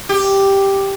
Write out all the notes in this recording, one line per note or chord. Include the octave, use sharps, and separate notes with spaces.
G4